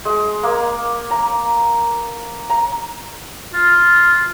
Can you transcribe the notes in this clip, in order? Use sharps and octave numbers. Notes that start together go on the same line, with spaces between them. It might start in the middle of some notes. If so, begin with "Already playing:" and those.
G#3
A#3
A#5
A#5
F4